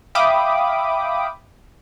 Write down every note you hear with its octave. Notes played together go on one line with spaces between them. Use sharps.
E5 F5 G5 B5 D6 D#6